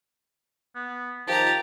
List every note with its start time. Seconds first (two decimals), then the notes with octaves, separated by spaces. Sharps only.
0.76 B3
1.27 D#3 F3 G4 A5 A#5